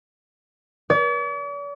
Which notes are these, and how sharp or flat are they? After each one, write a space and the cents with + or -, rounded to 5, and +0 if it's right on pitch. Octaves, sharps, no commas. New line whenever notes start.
D5 -45